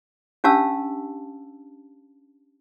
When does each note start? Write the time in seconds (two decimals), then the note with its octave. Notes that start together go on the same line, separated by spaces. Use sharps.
0.44 C#4 D4 G4 F5 A5 E6